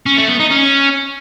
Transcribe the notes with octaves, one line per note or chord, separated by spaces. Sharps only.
C#4
A3
B3
D#4
C#4